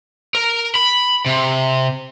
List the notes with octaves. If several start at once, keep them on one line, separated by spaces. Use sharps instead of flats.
A#4
B5
C3